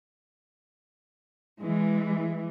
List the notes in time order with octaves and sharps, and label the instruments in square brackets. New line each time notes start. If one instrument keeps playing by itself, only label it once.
[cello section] E3 G#3